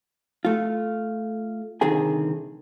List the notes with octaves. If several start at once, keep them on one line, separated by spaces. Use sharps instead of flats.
A3 F4
C2 D3 D#3 C4 G#4 G#5